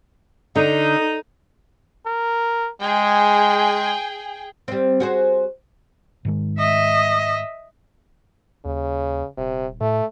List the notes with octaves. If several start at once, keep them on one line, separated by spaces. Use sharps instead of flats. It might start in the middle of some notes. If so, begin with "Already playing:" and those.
D3 D#4
A#4
G#3 G#4 G5
G3 C4
F#4 G#4 C5
G#2 D#3 G#3
D#5 E5
D#2 C#3
D#1 C3
A2 A3